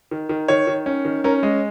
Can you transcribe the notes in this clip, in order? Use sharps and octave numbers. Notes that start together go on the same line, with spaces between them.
D#3
D#3
D#3 C#5
D#3
C#4
D#3
C#4 A#4
G#3 D#5